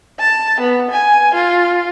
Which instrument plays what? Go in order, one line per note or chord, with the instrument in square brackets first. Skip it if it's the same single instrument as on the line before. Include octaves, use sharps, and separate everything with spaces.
[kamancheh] A5
B3
G#5
F4